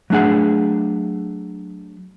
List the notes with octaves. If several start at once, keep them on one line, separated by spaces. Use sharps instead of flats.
F#3 A3 D4 G#4 F#5